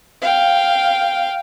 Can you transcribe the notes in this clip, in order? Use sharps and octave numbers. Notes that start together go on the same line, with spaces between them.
F5 G5